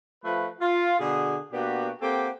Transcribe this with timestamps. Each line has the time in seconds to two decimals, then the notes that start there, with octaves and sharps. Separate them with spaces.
0.24 F3 A3 B4
0.61 F4
0.99 B2 D3 D4 G#4
1.52 B2 A#3 B3 D4 F#4 G4
2.02 A#3 C4 G4 A4 F#5 G5